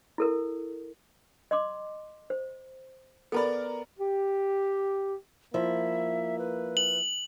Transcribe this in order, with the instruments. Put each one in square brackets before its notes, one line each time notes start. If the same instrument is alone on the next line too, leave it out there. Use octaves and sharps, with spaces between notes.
[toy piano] E4 A4 A#4
D#5 C6 D6
C5
[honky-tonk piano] B3 A#4 D5 [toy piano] A4 A5 B5
[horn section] G4
[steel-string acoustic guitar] F3 E4 [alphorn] A#3 [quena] E5
[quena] B4
[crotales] F#7